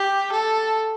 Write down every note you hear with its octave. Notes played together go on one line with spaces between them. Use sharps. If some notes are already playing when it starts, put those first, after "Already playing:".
Already playing: G4
A4